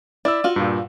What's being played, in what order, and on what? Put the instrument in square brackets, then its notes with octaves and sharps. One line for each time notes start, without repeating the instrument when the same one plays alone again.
[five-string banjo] E4 [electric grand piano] D5 E6
[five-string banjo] F4 F#4
[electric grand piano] G2 A#2